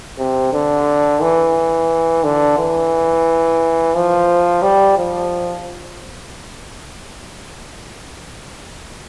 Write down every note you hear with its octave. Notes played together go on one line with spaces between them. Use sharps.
C3
D3
E3
D3
E3
F3
G3
F3